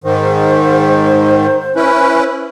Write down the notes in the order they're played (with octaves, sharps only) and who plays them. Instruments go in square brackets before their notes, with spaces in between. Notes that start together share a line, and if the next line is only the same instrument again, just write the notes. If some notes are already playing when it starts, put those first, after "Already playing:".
[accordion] G#2 D#3 [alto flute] C5
[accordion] C#4 E4 B4